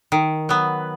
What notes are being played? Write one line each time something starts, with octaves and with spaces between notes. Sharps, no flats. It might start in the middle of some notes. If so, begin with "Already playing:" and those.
D#3
F#3 B3